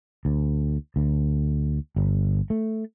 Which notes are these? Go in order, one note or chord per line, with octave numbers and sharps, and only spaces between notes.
D2
D2
G1
A3